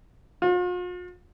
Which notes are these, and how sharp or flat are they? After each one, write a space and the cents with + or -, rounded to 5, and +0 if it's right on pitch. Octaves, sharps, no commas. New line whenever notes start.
F4 +45